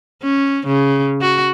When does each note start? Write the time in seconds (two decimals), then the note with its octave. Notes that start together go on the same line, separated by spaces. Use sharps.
0.23 C#4
0.67 C#3
1.21 F#4